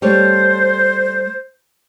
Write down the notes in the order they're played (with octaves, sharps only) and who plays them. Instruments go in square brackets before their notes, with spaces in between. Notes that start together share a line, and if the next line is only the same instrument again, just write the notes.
[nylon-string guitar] G3 A3 C#5 [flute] C5